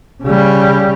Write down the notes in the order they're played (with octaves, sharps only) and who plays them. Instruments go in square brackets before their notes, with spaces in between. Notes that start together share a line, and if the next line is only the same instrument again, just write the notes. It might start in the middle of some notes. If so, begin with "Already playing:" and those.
[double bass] C#3 G3